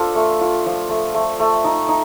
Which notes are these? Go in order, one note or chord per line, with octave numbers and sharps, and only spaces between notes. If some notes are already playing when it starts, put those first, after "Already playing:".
Already playing: D4 F4 A4 C5
A3
F4
F3
A3
A3
A3
D#4
D#4